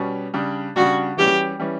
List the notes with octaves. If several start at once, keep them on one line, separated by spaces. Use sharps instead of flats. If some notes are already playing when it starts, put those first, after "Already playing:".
Already playing: B2 G3 C#4
C#3 G3 D4
C#3 G3 D4 F#4
E3 G3 C#4 G4
E3 G3 C#4